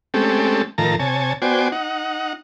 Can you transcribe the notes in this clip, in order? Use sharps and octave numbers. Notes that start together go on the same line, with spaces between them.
G#3 A3 C4 C#4 G4 A4
A2 D#3 F3 A#4 A5 A#5
C3 C#5 G#5 A5
B3 F#4 C5 D5 G5 G#5
D#4 F#5